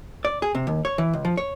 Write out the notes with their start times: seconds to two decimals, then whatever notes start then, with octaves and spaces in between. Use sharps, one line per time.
0.25 D5
0.42 G#4
0.55 C3
0.67 D#2
0.85 C#5
0.98 E3
1.13 C#2
1.25 F3
1.37 C#5